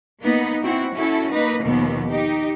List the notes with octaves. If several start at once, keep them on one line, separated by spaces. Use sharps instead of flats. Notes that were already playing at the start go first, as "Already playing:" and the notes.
A#3 B3 D#4
C4 E4 F#4
C#4 E4 F#4 A4
A#3 D#4 B4
D#2 B2 F3 B3
D#4 G4